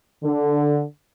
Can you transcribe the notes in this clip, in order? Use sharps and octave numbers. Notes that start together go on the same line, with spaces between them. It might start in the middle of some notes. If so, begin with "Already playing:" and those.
D3